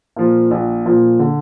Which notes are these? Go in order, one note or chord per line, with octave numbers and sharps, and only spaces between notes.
A#2 F3
A#1
A#2 F3
D3